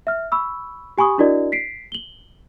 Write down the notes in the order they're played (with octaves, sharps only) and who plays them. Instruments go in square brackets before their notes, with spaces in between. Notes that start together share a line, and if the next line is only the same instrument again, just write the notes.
[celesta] E5 F6
B5 C#6 E6
G4 G#5 B5 C#6 D#6
D4 E4 F#4 A#4 D5 D#5
B6 C7 D7
F#7 G7